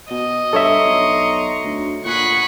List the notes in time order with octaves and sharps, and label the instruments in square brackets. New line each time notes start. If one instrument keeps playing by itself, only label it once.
[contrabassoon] B2 [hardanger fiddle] D#5
[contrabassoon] G2 [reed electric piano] A4 C#5 E5 [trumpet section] A#5 C6 C#6
[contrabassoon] B1
D2
[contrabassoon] A#2 [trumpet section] G#4 F#5 [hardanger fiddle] B5 C#6